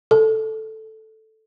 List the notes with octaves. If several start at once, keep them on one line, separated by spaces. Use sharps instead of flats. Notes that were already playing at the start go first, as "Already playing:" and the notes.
A4